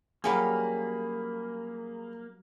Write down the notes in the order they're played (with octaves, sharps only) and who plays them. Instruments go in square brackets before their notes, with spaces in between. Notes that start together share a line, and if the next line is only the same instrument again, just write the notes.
[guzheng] F#3 G3 C#4 [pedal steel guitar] A#3 [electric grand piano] G#4 F5 B5